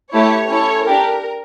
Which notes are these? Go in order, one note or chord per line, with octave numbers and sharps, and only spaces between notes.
A3 E4 G4 C#5
C#4 E4 A4 C#5
D4 G4 A#4